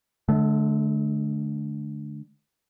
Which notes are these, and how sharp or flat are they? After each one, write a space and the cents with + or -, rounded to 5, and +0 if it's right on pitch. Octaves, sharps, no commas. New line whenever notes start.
D3 +0 A3 -40